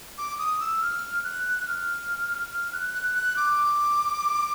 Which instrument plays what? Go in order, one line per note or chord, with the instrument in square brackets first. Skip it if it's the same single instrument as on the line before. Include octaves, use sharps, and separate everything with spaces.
[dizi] D6
D#6
E6
F6
F#6
F6
F6
F#6
F#6
F#6
D6